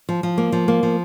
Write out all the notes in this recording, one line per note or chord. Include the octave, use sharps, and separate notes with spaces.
F3
F3
A#3
F3
A#3
F3